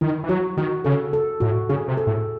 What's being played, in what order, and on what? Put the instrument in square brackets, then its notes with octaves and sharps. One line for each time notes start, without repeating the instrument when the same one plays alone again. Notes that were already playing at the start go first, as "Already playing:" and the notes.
[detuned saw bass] D#3 [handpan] E4
[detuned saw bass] E3
[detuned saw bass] F#3 [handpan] F#4
[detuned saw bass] D#3 [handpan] F#4
[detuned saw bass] C#3 [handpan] A4
[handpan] A4
[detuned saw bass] A2 [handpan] F#4
[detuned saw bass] C#3 [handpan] G#4
[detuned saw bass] C3
[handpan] A4
[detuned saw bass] A2